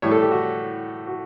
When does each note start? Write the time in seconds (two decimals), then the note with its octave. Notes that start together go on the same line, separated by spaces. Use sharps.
0.02 A2 E3 G3 C#5
0.11 A4
0.21 G4
0.31 F#4
1.07 F#4